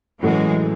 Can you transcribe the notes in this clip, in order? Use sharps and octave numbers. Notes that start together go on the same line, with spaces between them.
A2 E3 F#3 G#3 A3 C#4 F#4